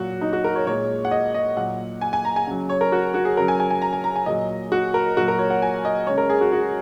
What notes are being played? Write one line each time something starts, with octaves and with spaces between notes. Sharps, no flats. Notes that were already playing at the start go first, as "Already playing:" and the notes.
Already playing: A#2 F#3 F#4
D#4
F#4
A#4
C#5
A#2 G#3 C#5
F#5
D#5
D#5
A#2 F#3 F#5
G#5
G#5
A#5
G#5
C#3 F#3
C#5
A#4
F#4
F#4
G#4
C#3 F#3 A#4
G#5
G#5
G#5
A#5
G#5
A#5
G#5
A#2 F#3 D#5
F#4
A#4
A#2 F#3 F#4
A#4
C#5
F#5
G#5
D#5
C#3 G#3 C#5
A#4
G#4
F#4
F#4